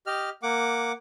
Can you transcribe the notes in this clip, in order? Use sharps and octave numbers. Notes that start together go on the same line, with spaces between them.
G4 D#5 F6
A#3 F#5 D6